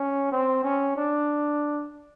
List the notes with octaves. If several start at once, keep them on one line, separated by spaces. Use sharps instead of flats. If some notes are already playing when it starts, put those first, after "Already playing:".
Already playing: C#4
C4
C#4
D4